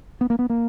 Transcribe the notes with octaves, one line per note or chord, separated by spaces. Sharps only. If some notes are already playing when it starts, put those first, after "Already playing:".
B3
A#3
B3
A#3